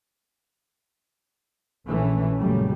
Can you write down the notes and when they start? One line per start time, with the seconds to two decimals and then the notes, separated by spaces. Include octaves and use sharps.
1.87 A#1 E3 A3 C#4
2.39 F#2 A#2 C#3 G3 A3